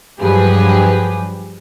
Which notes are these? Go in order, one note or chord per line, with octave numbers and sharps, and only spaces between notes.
G2 F3 F#3 G4 G#4 B4